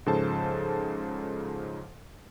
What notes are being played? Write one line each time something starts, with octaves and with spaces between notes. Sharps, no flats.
G#2 C#3 F3 A4 C5 A5